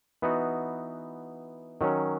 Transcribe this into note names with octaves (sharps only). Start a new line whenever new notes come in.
E3 B3 D#4 F#4
D#3 F#3 C#4